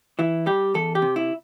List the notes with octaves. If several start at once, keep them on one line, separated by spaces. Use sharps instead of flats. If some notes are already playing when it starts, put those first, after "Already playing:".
E3 E4
G3 G4
E2 A4
G4
C3
E4